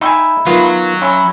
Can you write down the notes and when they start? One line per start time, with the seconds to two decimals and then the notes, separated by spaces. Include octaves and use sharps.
0.01 D#4 E4 G5 G#5
0.47 D#3 F#3 B3 F4
1.02 C#4 E4 E5